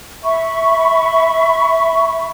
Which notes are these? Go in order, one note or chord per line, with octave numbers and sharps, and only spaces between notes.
E5 B5 C#6